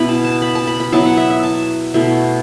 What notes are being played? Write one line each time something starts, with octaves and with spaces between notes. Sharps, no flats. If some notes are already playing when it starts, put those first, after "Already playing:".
Already playing: B2 B3 E4 B5
A5
A5
B5
A5
B5
B5
F#3 B3 E4 A5
F#5
E5
E5
A5
B2 A3 E4